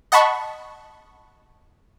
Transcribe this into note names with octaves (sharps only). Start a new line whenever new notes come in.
D#5 F#5 A5 B5 C#6